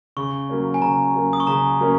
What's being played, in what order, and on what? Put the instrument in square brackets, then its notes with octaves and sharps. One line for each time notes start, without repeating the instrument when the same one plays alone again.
[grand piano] C#3 [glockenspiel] C#6
[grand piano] F#3 A#3 C#4
[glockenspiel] G#5
[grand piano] C#3 [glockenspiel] A#5
[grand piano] F#3 A#3 C#4
[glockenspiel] D#6
C#6
[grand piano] C#3 [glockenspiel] A#5
[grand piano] F#3 A#3 C#4